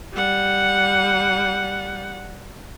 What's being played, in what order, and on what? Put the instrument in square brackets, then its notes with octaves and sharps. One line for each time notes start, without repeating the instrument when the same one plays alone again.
[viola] G3 F#5